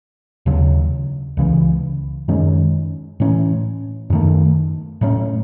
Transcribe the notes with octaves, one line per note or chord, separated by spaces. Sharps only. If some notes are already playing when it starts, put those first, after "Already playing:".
D#2 C#3 F#3
C#2 C#3 E3
F#2 D#3 G#3 C#4
A2 E3 A3 C#4
F#2 D#3 A3
A2 F#3 A3 C#4